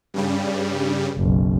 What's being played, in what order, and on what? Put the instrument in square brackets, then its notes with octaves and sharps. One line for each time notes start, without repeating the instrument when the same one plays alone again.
[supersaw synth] G2 C#3 G3
[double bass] F#1 B1